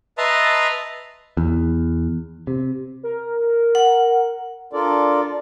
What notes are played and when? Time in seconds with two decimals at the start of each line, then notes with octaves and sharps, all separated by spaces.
0.18 B4 D#5 E5 A5 A#5 C6
1.37 E2
2.47 C3
3.03 A#4
3.75 F#5
4.73 D4 F4 A4 A#4 D5